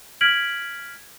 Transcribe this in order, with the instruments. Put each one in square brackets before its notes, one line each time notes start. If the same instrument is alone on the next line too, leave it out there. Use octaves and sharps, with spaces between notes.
[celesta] F6 G#6 B6 D7 F#7